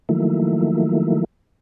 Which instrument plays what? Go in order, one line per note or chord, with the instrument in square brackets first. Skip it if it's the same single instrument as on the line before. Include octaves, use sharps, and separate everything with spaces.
[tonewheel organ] D#3 F3 F#3 A3 A#3 E4